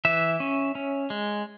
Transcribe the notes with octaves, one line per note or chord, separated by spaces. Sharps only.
E3 E5
C#4
C#4
G#3